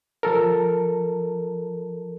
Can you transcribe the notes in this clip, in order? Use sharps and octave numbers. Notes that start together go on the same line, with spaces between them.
F3 A4 A#4